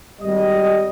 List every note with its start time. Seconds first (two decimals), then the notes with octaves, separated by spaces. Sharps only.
0.22 G#1 G3 D#5